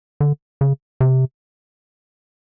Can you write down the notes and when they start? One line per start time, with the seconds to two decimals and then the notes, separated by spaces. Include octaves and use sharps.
0.21 D3
0.61 C#3
1.01 C3